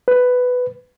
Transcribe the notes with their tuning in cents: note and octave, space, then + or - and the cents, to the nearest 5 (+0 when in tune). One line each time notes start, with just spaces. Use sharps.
B4 +10